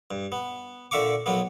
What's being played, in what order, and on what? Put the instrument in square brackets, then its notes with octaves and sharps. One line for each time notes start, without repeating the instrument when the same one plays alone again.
[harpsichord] G2
B3
A#2 D3 E5 F5 C#6 D6
B1 F#3 A#3 B3